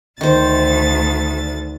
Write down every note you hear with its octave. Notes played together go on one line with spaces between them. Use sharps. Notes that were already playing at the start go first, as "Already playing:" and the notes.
D2 D#3 C5 A6